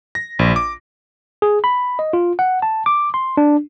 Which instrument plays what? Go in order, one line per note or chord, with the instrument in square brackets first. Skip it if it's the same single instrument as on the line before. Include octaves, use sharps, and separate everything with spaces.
[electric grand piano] A#6
A#1
D6
[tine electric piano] G#4
B5
D#5
F4
F#5
A5
D6
C6
D4